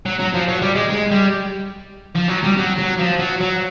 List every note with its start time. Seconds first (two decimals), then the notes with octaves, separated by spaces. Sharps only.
0.06 F#3
0.20 F#3
0.34 F3
0.48 F#3
0.62 G3
0.75 G#3
0.90 G#3
1.11 G3
2.16 F3
2.29 F#3
2.44 G3
2.57 F#3
2.79 F#3
3.00 F3
3.20 F#3
3.41 F#3